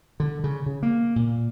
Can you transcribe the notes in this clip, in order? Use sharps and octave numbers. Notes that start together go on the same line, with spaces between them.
D3
C#3
C#3
A#3
A#2